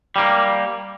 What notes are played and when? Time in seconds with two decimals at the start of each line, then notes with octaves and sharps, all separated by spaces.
0.16 G3 A#3